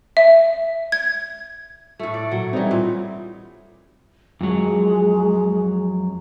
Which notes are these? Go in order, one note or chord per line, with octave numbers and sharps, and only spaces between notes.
E5
G#6
A2 A3
D5
A#2 F#3
E3 G3 C4 D#4
A#2
F2 F#3 G#3